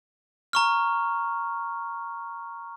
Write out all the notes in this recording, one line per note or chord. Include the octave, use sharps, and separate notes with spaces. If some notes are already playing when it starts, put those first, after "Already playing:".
A#5 C#6 F6